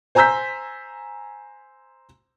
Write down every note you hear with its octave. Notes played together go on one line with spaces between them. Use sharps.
C5 G#5 A#5 E6 G6 B6